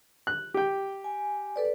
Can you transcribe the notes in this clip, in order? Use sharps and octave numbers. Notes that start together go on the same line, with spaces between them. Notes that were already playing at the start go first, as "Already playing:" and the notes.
F#6
G4 G5
G#5
A4 B4 D5